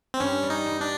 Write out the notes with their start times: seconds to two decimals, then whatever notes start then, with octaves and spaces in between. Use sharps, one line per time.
0.14 C4
0.20 G2 C#4
0.43 G3
0.50 D#4
0.66 G2
0.81 D4